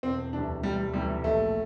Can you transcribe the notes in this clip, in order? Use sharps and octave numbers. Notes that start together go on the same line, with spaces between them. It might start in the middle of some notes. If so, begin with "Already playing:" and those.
E1 C4
D2 C3 E3 D4
E1 G3
D2 C3 E3 G3
A#1 A3